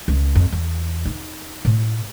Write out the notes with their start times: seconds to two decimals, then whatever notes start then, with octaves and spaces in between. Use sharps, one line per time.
0.08 C#2
0.35 F2
0.52 E2
1.05 D#4
1.65 A2